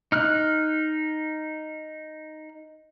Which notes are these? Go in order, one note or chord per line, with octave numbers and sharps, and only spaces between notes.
D#4 F6 F#6